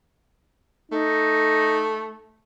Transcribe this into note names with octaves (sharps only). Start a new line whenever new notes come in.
A3 D#4